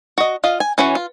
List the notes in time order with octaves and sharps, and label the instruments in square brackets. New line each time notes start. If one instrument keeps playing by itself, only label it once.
[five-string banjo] F#4 D#5
F4 D#5 F5
G#5
E3 C#4 F#4 C#5
F4